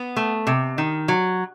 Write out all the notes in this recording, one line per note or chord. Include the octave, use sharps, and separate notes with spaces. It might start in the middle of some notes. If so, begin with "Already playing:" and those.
Already playing: B3
A3
C3
D#3
F#3